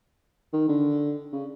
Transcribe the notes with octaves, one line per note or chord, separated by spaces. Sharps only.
D#3
D3
C#3